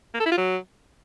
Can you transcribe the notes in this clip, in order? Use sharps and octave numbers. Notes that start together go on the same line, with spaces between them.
A#3
A4
E4
F4
F#3